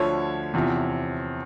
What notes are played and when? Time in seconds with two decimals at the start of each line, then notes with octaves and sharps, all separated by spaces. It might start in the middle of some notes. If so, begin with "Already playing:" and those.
Already playing: D2 D3 F3 C#5
0.54 E2 C3 F3